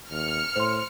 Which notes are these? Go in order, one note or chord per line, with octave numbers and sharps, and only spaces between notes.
D#2 F6 C#7
A2 C5 C6